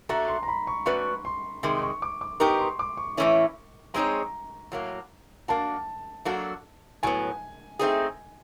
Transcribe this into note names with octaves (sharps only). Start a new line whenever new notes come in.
A3 D4 F#4 A4 A#5
C6
A#5
B5
C#6
A3 C#4 F#4 B4 D5 C#6
C6
C3 D#3 G#3 C6
C#6
D6
D6
B3 D#4 G4 A#4 C#6
C6
D6
C#6
A2 E3 A3 C#4 E4
G#3 C4 D#4 G#4 C#5 A#5
A2 F#3 A#3
A#3 D4 F#4 A5
F#3 A#3 D4 F#4 A4
A2 F#3 B3 G#5
A3 C4 D#4 G#4